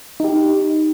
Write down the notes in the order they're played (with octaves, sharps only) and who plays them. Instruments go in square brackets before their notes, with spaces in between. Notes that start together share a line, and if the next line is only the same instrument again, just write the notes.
[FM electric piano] D#4 G4